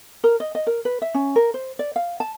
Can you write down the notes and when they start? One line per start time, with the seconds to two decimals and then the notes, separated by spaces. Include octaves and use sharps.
0.24 A#4
0.40 D#5
0.55 D#5
0.67 A#4
0.85 B4
1.02 E5
1.14 C#4
1.36 A#4
1.54 C5
1.79 D5
1.96 F5
2.20 A5